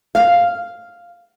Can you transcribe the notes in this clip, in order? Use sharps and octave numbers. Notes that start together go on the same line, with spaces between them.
F5